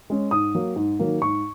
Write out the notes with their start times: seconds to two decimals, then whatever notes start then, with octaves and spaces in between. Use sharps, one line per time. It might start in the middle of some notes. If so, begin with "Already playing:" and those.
0.10 G#3 C#4
0.31 G#2 D#6
0.55 F#3 A#3
0.76 G#2
0.99 D#3 F#3 A#3
1.21 G#2 C#6